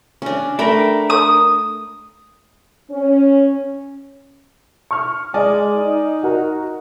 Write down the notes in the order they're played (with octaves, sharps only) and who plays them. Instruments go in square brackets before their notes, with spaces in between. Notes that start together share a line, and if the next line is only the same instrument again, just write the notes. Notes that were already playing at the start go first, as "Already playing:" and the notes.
[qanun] C#4 D4
[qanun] A3 G5 B5 [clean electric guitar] D4 A#4
[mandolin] D#6
[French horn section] C#4
[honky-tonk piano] C#6 F6
[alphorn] G#3 [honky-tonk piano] D5 D#5 G#5
[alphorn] D#4
[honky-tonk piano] F#4 A#4